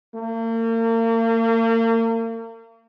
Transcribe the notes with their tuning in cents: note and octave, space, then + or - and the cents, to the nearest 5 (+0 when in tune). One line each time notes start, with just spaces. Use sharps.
A#3 -40